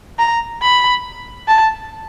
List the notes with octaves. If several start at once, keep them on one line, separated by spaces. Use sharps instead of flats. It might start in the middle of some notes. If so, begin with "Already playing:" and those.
A#5
B5
A5